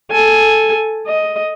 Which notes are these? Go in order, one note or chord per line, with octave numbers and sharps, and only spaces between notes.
A4 G#5
D#5